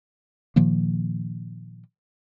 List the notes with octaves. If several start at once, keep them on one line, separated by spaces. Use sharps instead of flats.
A#2 D#3 F3 A#3